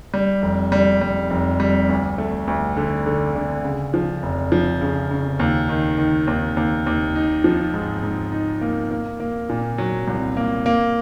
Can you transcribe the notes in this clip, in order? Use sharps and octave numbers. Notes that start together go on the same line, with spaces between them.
G3
F1
G3
G3
F1
G3
D2
A3
D2
D3
D3
D3
C#3
F3
F1
F3
C#3
C#3
D#2
D#3
D#3
D#2
D#2
D#2
D#4
F3
G#2
G#2
D#4
A#3
A#3
A#3
A#2
F#3
C2
A#3
A#3